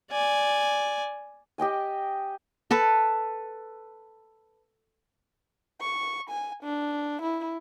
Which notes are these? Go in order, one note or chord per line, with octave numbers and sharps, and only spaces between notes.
D5 G#5
G4 D#5 G5 G#5
A4 B4 A5
C#6
G#5
D4
E4